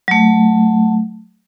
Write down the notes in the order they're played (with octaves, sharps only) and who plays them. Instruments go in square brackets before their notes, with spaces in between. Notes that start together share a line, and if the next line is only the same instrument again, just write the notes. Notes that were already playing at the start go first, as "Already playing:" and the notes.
[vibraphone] F#3 A3